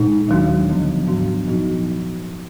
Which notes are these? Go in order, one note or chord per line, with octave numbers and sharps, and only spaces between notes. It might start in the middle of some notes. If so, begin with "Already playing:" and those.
Already playing: A#2 G#3 D#4
D#2 D#3 F#3 D4 F#4
D2 D3 F3 B3 D4
G#2 F#3 B3 D4 F#4
A#2 F3 B3 D#4 F#4